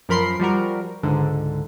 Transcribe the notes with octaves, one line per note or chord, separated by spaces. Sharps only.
F#2 F3 A#4 B5 C6 C7
F3 G3 F#4 A#4
C#2 G#2 D3